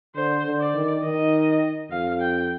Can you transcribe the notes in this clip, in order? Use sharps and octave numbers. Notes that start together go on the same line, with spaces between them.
D3 C5
D3
D5
D#3
D#3 D#5
F2 F5
G5